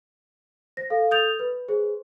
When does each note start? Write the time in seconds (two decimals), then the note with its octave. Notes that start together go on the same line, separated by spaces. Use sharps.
0.77 C5 A#6
0.90 A4 F5
1.11 A4 D#6 G6 A6 F7
1.39 B4
1.68 G#4 C5